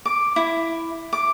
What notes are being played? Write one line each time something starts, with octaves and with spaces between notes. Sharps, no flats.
D6
E4
D6